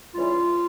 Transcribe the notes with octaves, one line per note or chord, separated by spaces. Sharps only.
C#3 E3 G3 F4